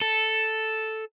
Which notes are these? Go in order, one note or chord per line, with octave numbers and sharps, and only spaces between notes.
A4